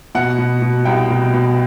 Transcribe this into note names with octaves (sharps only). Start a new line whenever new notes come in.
B2 F#5
B2
B2
C2 G5
B2
B2